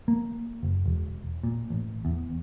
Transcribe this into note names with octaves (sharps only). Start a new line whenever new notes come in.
A#3
F#1
E1
A#2
A1
E2